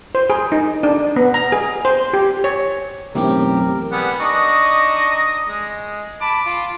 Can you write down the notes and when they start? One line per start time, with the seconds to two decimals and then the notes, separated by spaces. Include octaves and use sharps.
0.15 C5
0.30 G#4
0.52 D#4
0.83 D4
1.16 B3
1.34 A#5
1.52 G#4
1.85 C5
2.14 G4
2.44 C#5
3.15 B1 F#2 A2 E3 C4 G4 A#4
3.92 G3 B3 G#4 F#5
4.20 D4 D#4 D#5 C#6
5.47 G#3
6.21 A5 B5 D6
6.46 F4